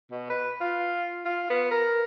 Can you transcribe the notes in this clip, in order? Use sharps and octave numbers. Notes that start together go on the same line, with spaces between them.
B2
B4
F4
F4
B3
A#4